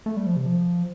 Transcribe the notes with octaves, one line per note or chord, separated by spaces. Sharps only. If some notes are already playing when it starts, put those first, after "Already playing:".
A3
G3
F3
C3
F3